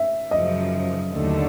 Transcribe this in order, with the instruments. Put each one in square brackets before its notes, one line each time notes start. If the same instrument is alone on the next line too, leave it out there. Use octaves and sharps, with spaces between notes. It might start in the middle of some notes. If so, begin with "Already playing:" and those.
Already playing: [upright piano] E5
[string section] F#2 C#3 F3 [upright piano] D#5
[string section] D#2 D3 F#3 A3